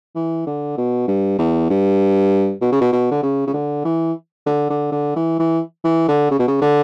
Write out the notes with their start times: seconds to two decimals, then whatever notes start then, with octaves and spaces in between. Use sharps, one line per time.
0.16 E3
0.47 D3
0.78 B2
1.08 G2
1.38 E2
1.70 G2
2.61 B2
2.72 C#3
2.81 B2
2.93 B2
3.11 D3
3.23 C#3
3.47 C#3
3.54 D3
3.85 E3
4.46 D3
4.70 D3
4.92 D3
5.16 E3
5.39 E3
5.84 E3
6.08 D3
6.31 C#3
6.39 B2
6.48 C#3
6.61 D3